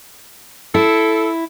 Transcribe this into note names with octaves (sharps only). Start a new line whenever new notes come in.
E4 A4